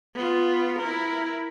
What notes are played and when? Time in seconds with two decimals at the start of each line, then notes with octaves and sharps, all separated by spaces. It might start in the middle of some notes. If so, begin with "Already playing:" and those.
0.15 B3 F4
0.79 E4 A#4